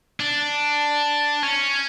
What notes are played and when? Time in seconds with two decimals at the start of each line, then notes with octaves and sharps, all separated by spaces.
0.20 D4
1.43 C#4